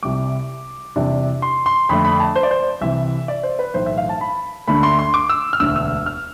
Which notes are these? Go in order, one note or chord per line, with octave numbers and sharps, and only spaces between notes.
C2 C3 G3 D6
E2 C3 E3 G3 D4
C6
C6
F2 D3 A3 B5
B5
A5
C5
D5
C5
C2 C3 E3 E5
D5
C5
B4
B1 A2 E3 A3 C5
E5
F5
A5
B5
D2 D3 A3 B5
C6
C6
D6
E6
F6
E1 D2 D3 E6
E6
F6